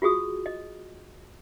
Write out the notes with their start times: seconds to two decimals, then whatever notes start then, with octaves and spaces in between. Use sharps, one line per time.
0.02 F4 F#4 G#4 D#6
0.46 D#5